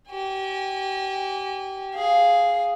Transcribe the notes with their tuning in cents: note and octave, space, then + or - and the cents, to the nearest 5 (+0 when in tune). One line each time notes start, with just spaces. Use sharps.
G4 -30 G#5 -35
G#4 +0 F5 +0